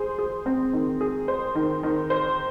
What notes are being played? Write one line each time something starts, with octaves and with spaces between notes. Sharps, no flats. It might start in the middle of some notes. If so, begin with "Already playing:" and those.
Already playing: G#4 C5
G#4
C4
D#3
G#4
C5
D#3
D#3
C5